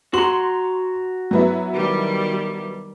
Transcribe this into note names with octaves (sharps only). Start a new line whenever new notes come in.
F#4 A#5 C6 F#7
F#3 B3 E4
D#3 G3 G4